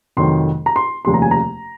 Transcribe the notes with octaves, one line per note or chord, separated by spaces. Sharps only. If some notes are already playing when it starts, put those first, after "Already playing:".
F1 F2 D#3 F#3 C6
A#5
C6
F1 D#2 C#3 F3 C6
A#5
G#5
A#5